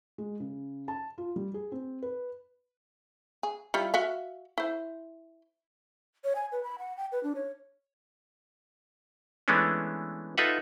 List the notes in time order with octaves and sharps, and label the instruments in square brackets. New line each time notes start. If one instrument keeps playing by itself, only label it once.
[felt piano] G#3
C#3
A5
F4
G3
G#4
C4
B4
[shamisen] G#4
G3 E4 F4
F#4 E5 F5
E4 C5
[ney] C#5
G#5
B4
B5
F#5
G5
B4
D4
C#5
[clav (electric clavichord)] E3 G#3 A3 B3 C#4 D4
D#4 F4 A4 B4 E5 F#5